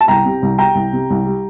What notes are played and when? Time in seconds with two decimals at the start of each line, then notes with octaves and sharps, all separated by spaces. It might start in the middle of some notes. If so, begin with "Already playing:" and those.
0.01 A5
0.08 C2 G5 A#5
0.25 C3
0.42 C2
0.58 G3 G5 A#5
0.75 C2
0.93 C3
1.10 C2
1.26 G3